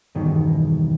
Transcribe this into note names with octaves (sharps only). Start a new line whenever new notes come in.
E2 G2 B2 D#3